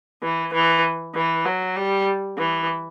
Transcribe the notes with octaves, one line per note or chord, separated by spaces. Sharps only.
E3
E3
E3
F#3
G3
E3